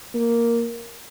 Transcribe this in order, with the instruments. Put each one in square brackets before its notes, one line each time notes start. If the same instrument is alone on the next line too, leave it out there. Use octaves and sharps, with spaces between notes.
[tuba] A#3